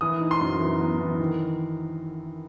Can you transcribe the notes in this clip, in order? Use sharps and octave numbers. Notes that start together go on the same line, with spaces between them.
E3 D#6
D#4
C6
F#2
E3
B3
E3
D#3